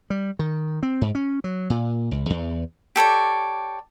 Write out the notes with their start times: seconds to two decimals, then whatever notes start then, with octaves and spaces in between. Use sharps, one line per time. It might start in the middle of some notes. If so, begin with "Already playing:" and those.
0.10 G3
0.39 D#3
0.83 C4
1.01 G#2
1.15 C#4
1.44 F#3
1.70 A#2
2.11 C#2
2.30 E2
2.96 G4 A4 C#5 D5